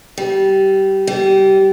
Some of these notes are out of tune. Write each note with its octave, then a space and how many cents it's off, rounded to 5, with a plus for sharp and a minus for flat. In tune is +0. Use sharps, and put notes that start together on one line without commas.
G3 -20
G3 -25